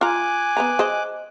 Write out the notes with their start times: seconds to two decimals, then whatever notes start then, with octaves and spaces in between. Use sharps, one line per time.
0.01 F4 G#5 A#5 D6 F#6
0.57 B3 B4 A#5
0.79 G#4 C5 D#5